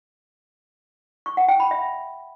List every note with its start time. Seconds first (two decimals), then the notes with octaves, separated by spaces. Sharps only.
1.26 C#6
1.37 F#5
1.49 G5
1.60 B5
1.71 E5